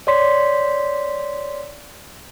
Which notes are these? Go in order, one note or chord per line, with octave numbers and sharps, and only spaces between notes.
C#5 D5 C6 B6